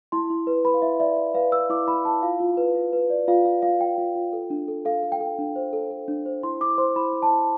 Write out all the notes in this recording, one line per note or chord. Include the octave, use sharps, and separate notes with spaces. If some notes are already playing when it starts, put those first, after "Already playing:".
E4 C6
E4
B4
B4 B5
F5
E4 E5
D5 E5
E4 E5
B4 F5
B4 E6
E4 D6
E4 B5
E4 A5
F4 F5
F4
B4
F4
B4
D5
F4 F5
F4 F5
F4 F5
F4 G5
F4
F4
A4
D4
A4
A4 F5
A4
G5
A4
D4
C5
A4
A4
D4
C5
E4 C6
E4 D6
C5 C6
E4 B5
E4
A5
E4